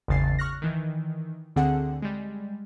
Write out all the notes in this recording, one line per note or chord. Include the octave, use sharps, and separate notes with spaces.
G#1 E2 C#3 A6 C7
C#6 F6 F#6 A#6
D#3 E3
D2 D3 C4 G#4 F#5
G3 G#3